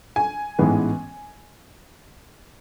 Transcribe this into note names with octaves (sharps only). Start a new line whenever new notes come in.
G#5
A1 G#2 E3 G#3 B3